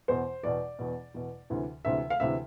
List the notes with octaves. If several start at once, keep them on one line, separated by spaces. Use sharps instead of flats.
E2 B2 C5
E2 B2 D5
E2 B2
E2 B2
D2 C3 E3
D2 C3 E3 E5
F5
D2 C3 E3 E5